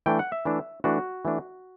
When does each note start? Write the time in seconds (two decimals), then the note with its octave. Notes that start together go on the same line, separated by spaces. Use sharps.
0.06 E3 A3 D4 G5
0.19 F#5
0.32 E5
0.45 E3 A3 D4
0.84 E3 A3 D4 F#4
1.25 E3 A3 D4